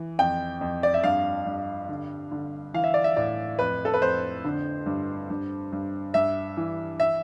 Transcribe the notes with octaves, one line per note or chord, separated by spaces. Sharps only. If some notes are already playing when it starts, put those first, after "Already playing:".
Already playing: E3
F2 G5
F2
D5
E5
G2 F5
G2
D3
D3
E3 F5
E5
D5
E5
A2 D5
F2 B4
A4
B4
F2 C5
D3
G2
G2
G2
G2 E5
E3
E5